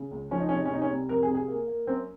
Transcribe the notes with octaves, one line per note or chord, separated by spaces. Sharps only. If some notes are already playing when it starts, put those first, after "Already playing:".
Already playing: C#3
C#2
F3 C#4
D#4
C3 C#4
D#4
C#4
C2 D#4
C#4
C2
F2 A#4
G#4
C3
G#4
A#3
A#3
F#2 C4